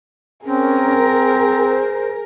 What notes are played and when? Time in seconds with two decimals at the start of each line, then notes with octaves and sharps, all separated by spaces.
0.45 C4 C#4 G#4 A#4
1.26 C5